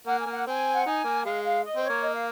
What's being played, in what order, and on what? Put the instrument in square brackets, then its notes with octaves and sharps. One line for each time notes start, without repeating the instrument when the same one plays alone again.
[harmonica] A#3 [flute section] F#5
[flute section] G#5
[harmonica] A#3
[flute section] F#5
[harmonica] C4 [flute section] G#5
[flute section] F#5
[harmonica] D#4 [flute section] G#5
[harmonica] A#3
[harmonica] G#3 [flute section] F5
[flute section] F5
D#5
[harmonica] C4 [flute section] C5
[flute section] C#5
[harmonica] A#3
[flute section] D#5
F5